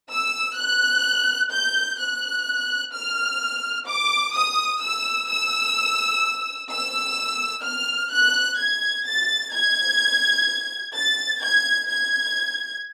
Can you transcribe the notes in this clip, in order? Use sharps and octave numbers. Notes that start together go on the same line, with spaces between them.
E6
F#6
G6
F#6
F6
D6
D#6
E6
E6
E6
F6
F#6
G#6
A6
G#6
A6
G#6
G#6